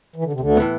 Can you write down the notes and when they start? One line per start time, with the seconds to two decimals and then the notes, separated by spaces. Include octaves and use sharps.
0.16 E3
0.24 D3
0.33 C3
0.40 D2 D3
0.57 A2 E3 B3